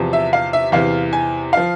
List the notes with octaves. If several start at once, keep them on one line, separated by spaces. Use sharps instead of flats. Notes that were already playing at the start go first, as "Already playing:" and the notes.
Already playing: E2 C3 F3
E5
F5
E5
E2 C3 E3 F5
G#5
F3 F5